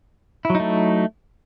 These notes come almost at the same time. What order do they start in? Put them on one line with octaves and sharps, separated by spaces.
E4 F#3 D#4 A3